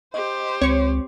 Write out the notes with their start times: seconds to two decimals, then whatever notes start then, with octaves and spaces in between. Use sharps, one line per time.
0.14 G4 C5 D#5
0.62 C#2 C4 C#5 C#6